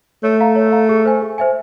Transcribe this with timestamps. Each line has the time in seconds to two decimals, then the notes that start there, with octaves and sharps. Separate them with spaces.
0.23 A3 C#5
0.40 F5 A#5
0.56 C#5
0.72 F5 A#5
0.89 G#4
1.05 C5 E5 G#5
1.22 G#4
1.38 C5 E5 G#5